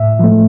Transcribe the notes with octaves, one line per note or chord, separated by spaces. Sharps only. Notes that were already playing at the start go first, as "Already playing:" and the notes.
Already playing: A2 E5
F3 A3